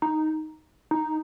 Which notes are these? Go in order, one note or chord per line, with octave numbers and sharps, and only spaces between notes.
D#4
D#4